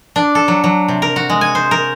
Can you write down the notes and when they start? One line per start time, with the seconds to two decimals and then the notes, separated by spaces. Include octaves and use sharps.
0.16 D4
0.35 A4
0.48 F#3
0.64 F#3
0.88 C3
1.02 A#4
1.16 F#4
1.30 G#3
1.41 G#5
1.55 C5
1.71 A#4